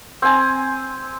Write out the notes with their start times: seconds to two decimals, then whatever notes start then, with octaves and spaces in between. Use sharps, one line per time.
0.22 C4 G#5